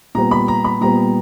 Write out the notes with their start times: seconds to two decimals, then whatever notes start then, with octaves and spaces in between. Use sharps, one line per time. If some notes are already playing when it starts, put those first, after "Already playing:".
0.15 A#2 G3 B3 A#5
0.31 B5
0.48 A#5
0.65 B5
0.81 A#2 G3 B3 A#5